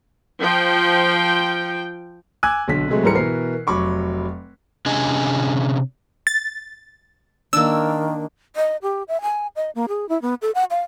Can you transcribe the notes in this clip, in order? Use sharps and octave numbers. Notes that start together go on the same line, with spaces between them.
F3 G5
G#5 D6 E6 F#6 G#6 D#7
B1 D3 B6
C3 F#3 G#3 A3
G#2 E3 G3 A4 A#4 C#7
B2 E3 A#4 C7
F1 F#3 B5 C#6 D6
C3 C#4 D4 G#4 D#5 G#5
A6
D#3 A#3 D4 E6
D#5
G4
E5
G#5
D#5
A#3
G#4
E4
B3
A4
F#5
F5